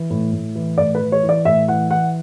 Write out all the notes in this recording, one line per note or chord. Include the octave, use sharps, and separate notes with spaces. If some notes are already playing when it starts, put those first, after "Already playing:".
Already playing: E3
A2
A2
E3
A2 D5
B4
E3
C#5
E3
D5
A2 E5
E3 F#5
E3 F#5